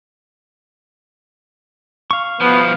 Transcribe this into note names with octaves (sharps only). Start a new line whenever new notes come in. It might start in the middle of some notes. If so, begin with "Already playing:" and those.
F5 C#6
B2 F3 B3